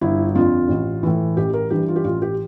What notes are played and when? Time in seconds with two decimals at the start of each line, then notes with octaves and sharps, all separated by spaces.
0.01 G1 E4
0.35 F2 D3 F4
0.68 A1
1.03 A2 E3
1.37 A1 G4
1.54 A#4
1.70 G2 E3 G4
1.88 F4
1.96 G4
2.04 A1 F4
2.22 G4